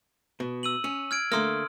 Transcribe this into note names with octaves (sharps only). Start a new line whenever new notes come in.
B2
E6 D#7 F#7
C#4
F6 G#6 D7
D3 A3 A#3 C6 D#6 F6